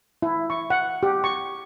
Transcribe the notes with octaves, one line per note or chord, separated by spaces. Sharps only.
E4
C#6
F#5
G4
C#6